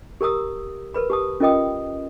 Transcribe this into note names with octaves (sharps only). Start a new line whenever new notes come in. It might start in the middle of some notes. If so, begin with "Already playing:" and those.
G4 A#4 A#5 D#6 E6
A#4 B4 B5
G4 A5 D#6
C#4 F4 A#4 D#5 G5 D#6